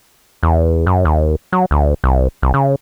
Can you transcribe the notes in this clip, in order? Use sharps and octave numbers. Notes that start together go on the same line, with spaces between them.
E2
F#2
D#2
F#3
D2
C2
C2
C#3